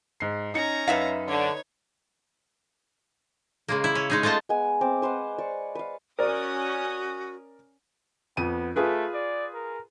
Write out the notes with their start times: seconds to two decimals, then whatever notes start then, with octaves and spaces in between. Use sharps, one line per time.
0.20 G#2 C7
0.54 C#4 D#4 A#5 C#7
0.88 F#2 D#4 B4 E5 F5
1.28 D3 C#5
3.68 C#3 G#3 A#3
3.84 E4
3.95 C#4
4.10 G#3 D#4 G#4
4.23 G#3 A3 F4 D#5 A5
4.49 G#3 B3 G#5
4.81 C4 D6
5.02 B4 C5 F5 F#5
5.38 D5 C#6
5.75 B4 F5
6.19 C#4 F#4 A#4 D5 D#6
8.37 F2 B3 D#7
8.76 A3 F4 G#4 B4
9.14 D5
9.54 A#4